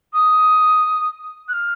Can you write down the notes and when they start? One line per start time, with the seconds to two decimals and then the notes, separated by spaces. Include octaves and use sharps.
0.13 D#6
1.48 F#6
1.53 F6